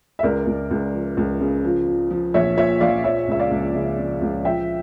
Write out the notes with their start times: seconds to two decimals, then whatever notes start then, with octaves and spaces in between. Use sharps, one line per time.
0.19 E5
0.23 C#2 A#4 D5
0.46 C#2
0.71 C#2
0.94 F3
1.17 C#2
1.41 C#3
1.64 F3
1.87 F3
2.10 F3
2.34 A#1 C#5 E5
2.58 A#2 C#5 E5
2.81 A#1 D5 F5
3.04 F3 C#5 E5
3.28 C#2 E5
3.39 D5 F5
3.51 C#2
3.75 C#3
3.98 C#3
4.22 C#2
4.45 F3 E5 G5